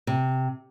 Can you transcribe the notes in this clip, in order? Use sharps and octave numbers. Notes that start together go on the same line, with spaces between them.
C3